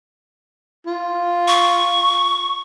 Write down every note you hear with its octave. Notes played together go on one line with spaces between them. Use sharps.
F4
C#6